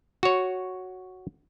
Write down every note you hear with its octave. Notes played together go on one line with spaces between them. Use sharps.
F#4 C#5